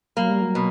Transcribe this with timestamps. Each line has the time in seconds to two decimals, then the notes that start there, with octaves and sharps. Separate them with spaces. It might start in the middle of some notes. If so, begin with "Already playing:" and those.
0.17 F#3 A#3
0.29 G3
0.41 F#3
0.55 B2